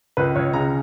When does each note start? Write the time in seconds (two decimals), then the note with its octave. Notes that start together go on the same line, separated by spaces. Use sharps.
0.17 C#2 B4
0.36 C#2 C#5
0.53 C#3 A#5